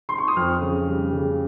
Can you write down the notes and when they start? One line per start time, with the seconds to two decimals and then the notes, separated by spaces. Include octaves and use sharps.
0.09 C6
0.18 C#6
0.28 D#6
0.37 F2 F6
0.62 C#3
0.87 G3
1.13 C#3